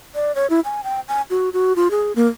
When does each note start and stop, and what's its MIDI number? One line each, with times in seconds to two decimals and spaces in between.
0.15 0.34 74
0.35 0.47 73
0.50 0.60 64
0.65 0.81 80
0.84 1.00 79
1.08 1.22 80
1.30 1.49 66
1.53 1.76 66
1.76 1.91 65
1.91 2.12 68
2.16 2.28 58